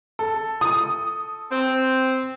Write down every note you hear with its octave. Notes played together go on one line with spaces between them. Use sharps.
A4
D#6
C4